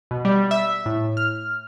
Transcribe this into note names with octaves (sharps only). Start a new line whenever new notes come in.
B2
G3
E5
A2
F6